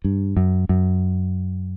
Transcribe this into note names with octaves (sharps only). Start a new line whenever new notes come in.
G2
F#2
F#2